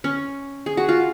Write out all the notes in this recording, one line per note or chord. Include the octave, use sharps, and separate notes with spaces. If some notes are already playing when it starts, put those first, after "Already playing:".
C#4
G#4
F#4
F4